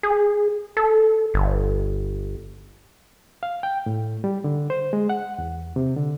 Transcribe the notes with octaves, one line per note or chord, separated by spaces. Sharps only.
G#4
A4
G1
F5
G5
A2
G3
D3
C5
G#3
F#5
E2
C3
D3